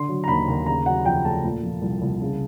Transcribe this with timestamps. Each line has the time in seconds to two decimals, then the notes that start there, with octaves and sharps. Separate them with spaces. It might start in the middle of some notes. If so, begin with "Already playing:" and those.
Already playing: D3 C6
0.09 F#3
0.24 A#5
0.28 D#2 B5
0.48 D#2
0.66 C#3 A#5
0.86 F#3 F#5
1.05 F2 G5
1.25 A3 A5
1.44 A#2
1.63 F3
1.82 C2
2.02 C2
2.22 C#3